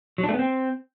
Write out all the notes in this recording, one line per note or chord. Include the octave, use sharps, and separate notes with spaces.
F#3
D4
A3
B3
C4